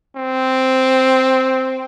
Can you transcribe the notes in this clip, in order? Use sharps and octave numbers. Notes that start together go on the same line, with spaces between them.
C4